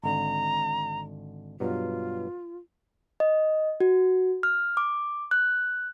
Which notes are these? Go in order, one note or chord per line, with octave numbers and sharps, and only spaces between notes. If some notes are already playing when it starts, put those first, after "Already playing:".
G#1 D3 A#5
G2 B2 F#3 F4
D#5
F#4
F6
D6
F#6